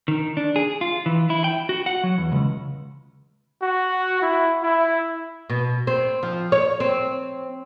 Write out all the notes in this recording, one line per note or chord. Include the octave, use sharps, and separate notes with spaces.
D#3
D4
G#4
F4
E3
E4
G5
F#4
F#5
F#3
E2
C#2
F#4
E4
E4
B2
C4
F3
C#5
C4